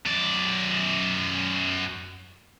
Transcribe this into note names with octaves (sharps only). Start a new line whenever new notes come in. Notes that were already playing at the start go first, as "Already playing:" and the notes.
F#2 D5